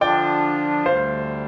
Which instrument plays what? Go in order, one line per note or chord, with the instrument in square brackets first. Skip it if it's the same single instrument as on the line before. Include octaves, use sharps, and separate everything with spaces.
[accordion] D3 F3 D4 F4 [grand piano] D5 G5
[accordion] D2 D3 G3 [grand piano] C5 F5